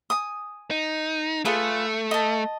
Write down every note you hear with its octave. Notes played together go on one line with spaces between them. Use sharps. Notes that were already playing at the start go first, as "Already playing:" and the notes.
G#5 D#6
D#4
A3 F4 G#4 B4
D#5 A5